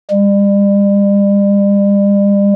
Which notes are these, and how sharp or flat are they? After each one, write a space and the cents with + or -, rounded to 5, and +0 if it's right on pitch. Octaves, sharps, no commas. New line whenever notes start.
G3 +40